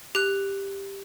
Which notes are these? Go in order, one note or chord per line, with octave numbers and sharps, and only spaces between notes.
G4 F#6